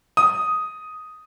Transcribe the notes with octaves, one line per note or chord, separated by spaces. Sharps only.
D#6